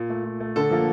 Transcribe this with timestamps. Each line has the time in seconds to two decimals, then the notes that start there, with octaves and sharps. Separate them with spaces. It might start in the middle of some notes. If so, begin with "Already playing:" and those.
Already playing: A#2
0.10 A3
0.25 A#2
0.40 A3
0.56 D3 A4
0.71 F3 A#3